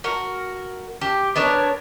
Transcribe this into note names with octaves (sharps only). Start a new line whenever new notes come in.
F#4 A#4
G4
B3 D4 A#4 C#5